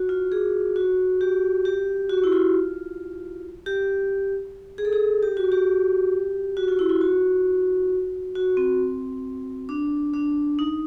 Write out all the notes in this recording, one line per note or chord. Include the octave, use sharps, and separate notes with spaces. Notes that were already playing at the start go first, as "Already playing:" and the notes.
Already playing: F#4
F4
G#4
F#4
G4
G4
F#4
E4
F4
G4
G#4
A4
G#4
G4
F#4
G4
F#4
F4
E4
F4
F#4
F#4
C4
D4
D4
D#4